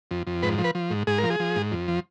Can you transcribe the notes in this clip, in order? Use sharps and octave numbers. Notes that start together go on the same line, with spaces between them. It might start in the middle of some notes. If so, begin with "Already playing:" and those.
F2
F2
G#2 B4
F3
B4
F3
G#2
G#2 G#4
A#4
F3
G#4
F3
G#2
F2
F3